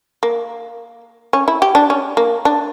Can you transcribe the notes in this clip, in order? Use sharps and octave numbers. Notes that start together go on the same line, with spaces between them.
A#3
C#4
E4
G4
D4
C#4
A#3
D4